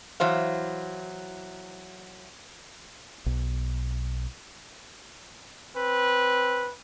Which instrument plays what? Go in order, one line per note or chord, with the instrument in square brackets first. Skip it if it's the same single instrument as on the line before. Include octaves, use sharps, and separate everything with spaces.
[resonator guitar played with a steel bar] E3 F#3 C5 F5
[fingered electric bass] B1
[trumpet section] C4 B4